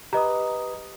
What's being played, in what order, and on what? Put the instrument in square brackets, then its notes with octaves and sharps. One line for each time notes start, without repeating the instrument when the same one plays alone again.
[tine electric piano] G4 B4 D#6 [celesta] D#5 A#5